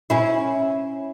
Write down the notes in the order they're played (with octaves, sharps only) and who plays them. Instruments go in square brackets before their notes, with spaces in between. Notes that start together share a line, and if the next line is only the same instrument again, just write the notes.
[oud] C#4 E4